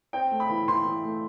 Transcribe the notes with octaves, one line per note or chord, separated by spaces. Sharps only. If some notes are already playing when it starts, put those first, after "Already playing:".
C4 G5
A3
B5
E3
E3 C6
E3
A3